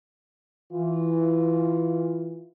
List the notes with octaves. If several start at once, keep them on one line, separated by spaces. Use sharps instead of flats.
E3 F4